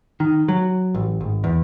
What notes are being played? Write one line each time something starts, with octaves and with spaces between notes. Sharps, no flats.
D#3
F#3
A1
G#1
E2